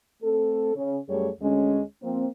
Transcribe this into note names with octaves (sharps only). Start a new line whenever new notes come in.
A3 C4 A4
C#3 C#4
F#2 G3 A3 G#4 C#5
D2 G#3 C#4
F3 A#3 C4